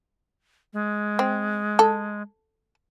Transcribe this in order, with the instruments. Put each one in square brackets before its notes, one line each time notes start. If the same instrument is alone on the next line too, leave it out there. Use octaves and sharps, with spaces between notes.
[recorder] G#3
[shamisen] C4
A4